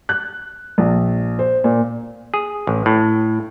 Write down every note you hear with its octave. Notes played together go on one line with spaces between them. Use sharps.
F#6
A#1
C5
A#2
G#4
A1
A2